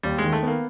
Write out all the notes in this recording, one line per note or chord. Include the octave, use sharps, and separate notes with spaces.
D#2 G3
G#3
D#3
A3
A#3 B3